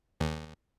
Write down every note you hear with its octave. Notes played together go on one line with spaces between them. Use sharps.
D#2